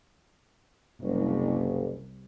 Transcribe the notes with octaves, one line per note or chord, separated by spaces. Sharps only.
F#1 C2